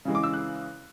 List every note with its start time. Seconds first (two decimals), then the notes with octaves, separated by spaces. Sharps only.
0.05 C#3 E3 G#3
0.15 D6
0.23 E6
0.33 F#6